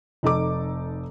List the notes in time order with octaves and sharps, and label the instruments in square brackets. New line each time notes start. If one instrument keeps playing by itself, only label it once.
[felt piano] F1 D#4 A4 D6